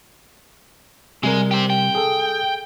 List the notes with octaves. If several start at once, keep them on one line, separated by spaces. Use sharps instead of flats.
C3 G3 G#3 A#4
G4 C5
G5
G#4 A4